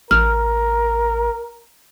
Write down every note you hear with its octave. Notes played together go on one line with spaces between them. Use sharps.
A1 A#4 F6